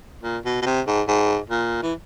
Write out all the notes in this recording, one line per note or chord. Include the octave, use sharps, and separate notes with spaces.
A#2
B2
B2
C3
G#2
G#2
A#2
E3